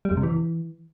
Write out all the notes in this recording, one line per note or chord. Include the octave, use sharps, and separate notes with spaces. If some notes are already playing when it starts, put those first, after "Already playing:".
G3
F2
C3
E3